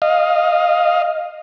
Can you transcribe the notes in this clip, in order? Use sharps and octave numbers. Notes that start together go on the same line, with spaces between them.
D#5 F5